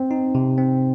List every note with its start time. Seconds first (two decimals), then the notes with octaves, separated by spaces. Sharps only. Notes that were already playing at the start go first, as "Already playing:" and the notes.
Already playing: C4
0.11 D#4
0.35 C3
0.58 C4